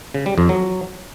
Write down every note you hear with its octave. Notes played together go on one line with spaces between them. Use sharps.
C#3
G3
F2
F#3